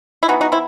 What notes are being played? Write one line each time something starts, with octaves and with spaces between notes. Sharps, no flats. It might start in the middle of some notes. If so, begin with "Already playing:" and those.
E4
E3 B3 D#4 F#4
D#4 F#4
C4 E4